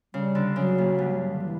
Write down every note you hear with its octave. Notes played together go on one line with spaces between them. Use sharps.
C#3 G3
D3
C#3 F#3
A#2
G2
D3
E3